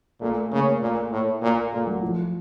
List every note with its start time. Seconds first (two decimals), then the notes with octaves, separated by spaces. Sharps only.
0.21 A#2 A3
0.51 C#3 A#3
0.82 A#2
1.12 A2
1.42 A#2
1.72 A#2 A3
1.87 F#3
2.02 F3